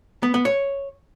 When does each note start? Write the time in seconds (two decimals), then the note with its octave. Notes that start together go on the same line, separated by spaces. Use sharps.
0.23 B3
0.34 B3
0.45 C#5